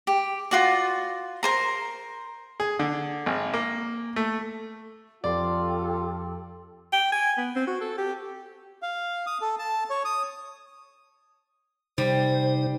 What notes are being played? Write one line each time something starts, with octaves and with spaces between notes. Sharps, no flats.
G4
F4 F#4 D5
A#4 C5 A#5
G#4
D3
G#1
A#3
A3
F2 F3 F4 G4 A4 D5 C6
G5
G#5
B3
C4
F#4
A4
G4
F5
D#6
A4
A5
C#5
D#6
C3 G3 D#4 C5